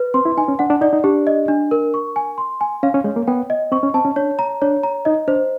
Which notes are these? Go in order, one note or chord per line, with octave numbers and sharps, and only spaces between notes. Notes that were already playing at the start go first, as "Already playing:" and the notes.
Already playing: B4
C4 C6
E4
D#4 G#5
C#4
D4 F#5
D4
D#4 D5
D#4
D4 G4
D#5
D4
A#4
C#6
G#5
C6
G#5
C#4 F5
C#4
G#3 C#5
A#3
B3 G5
D#5
C4 C#6
C#4
C4 A5
C#4
D4 C#5
A#5
D4 C#5
A#5
D#4 D#5
D4 C5